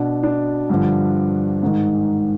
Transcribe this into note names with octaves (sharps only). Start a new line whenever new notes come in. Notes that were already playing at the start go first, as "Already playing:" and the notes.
Already playing: B2 D4
D4
G2 D3 F3
G#2 D#3